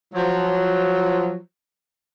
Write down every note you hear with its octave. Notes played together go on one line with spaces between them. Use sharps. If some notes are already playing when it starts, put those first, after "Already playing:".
F3 F#3